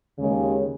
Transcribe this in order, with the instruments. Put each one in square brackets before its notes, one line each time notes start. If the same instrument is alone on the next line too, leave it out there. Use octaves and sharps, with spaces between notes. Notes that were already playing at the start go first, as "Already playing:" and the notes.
[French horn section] D#2 C#3 G#3